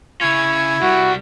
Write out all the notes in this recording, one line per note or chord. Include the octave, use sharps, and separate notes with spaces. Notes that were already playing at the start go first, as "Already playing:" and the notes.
C#3 C#4 E4 G#6
C2 G3 F#4